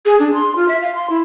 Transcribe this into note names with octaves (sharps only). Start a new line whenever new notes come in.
G#4
D4
C6
F4
E5
F5
C6
E4